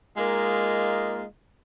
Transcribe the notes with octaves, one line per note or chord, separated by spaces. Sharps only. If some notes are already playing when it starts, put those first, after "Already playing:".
G#3 A#3 D#4 F4